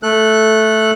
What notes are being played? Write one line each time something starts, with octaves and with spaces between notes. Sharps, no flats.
A3 A4 F#6